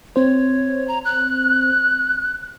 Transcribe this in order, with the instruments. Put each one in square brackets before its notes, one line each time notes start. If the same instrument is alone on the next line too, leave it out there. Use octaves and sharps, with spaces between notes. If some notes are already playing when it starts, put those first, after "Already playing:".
[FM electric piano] C4 C5 [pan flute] C#5
[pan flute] A#5
F#6